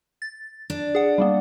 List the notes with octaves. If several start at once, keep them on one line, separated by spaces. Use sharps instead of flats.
A6
D4
G#4 F#5
G3 A#3 B3